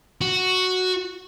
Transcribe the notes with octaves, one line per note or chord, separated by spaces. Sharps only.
F#4